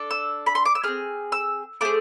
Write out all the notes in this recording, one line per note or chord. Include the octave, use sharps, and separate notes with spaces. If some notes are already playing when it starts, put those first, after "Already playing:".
Already playing: D4 A4
E6
B5
C6
D6
E6
C4 E4 G#4 F6
E6
A3 C4 G#4 D6